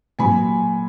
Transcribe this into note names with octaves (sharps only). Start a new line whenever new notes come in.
A#2 F#3 G#5 B5